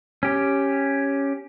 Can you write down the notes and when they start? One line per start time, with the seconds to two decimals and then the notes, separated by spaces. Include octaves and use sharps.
0.23 C#4 G4